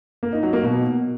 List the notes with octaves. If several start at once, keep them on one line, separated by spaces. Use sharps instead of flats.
A#3
D#4
F#3
A#3
B2